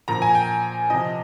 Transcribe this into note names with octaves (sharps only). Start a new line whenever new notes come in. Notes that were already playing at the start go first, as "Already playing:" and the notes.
A#2 F3 A#5
G#5
G5
C3 F3 D#5